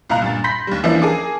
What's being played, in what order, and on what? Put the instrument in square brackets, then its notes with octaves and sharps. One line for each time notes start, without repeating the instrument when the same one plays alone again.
[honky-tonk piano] C2 A#2 F5 A#5 F#6
G2 A#2 A6
B5 C6 G6 A#6 B6
D#2 G3
E3 F3 A#3 C#4 D4 E4
G#4 A#4 G#5 A5 D6